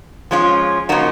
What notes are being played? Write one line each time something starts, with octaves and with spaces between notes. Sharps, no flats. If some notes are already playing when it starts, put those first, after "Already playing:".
F3 G#3 C#4 F4
C#3 F3 A#3 D#4 F#4